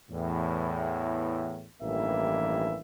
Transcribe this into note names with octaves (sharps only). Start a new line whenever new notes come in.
E2 A2
A1 G2 D#3 E3 A#3 E5